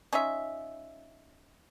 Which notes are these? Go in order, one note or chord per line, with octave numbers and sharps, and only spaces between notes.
C#4 D#4 F4 E5